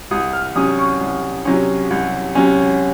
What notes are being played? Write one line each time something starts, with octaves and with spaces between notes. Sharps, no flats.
C2 D#6
F6
C3 F#3 C#4 D#6
C#6
C2
C3 F#3 C#4
C2
C3 F#3 C#4